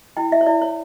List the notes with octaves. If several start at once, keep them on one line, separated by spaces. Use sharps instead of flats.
E4 G5
E4 E5
C#5
E4 D5
C#5